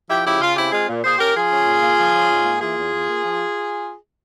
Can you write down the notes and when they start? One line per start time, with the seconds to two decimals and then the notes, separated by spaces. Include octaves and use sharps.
0.09 F3 E4 G4
0.25 C#3 E4 G4
0.40 C#3 F4
0.56 C4 E4 G4
0.72 G#3 F4 G#4
0.89 A#2
1.04 A#2 G#4 C5
1.19 C#4 G4 A#4
1.35 F3 F4 G#4
1.51 C#4
1.66 A#2
1.82 A#3
1.99 F3
2.14 C#4
2.30 G#2
2.45 A#3
2.61 E3 F4 G#4
2.77 E2
2.92 E2
3.09 A#3
3.24 F3